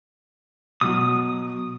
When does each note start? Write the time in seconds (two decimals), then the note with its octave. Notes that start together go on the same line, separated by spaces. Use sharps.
0.81 B2 F#3 D#6